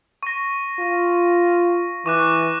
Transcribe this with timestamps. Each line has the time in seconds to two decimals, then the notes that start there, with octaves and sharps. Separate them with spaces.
0.23 C#6 A#6
0.79 F4
2.06 E3 C#6 D6 F#6